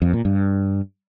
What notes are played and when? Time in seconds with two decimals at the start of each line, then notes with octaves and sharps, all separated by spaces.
0.02 F2
0.13 A#2
0.25 G2